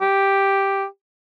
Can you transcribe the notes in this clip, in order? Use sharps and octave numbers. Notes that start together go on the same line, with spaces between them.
G4